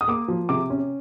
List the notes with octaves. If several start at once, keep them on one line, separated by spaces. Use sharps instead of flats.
D#6
A#3 D6
F3
C3 D6
C#4